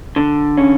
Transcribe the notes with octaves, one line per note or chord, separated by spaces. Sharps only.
D3
C#4